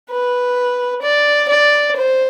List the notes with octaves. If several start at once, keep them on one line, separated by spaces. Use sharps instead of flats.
B4
D5
D5
C5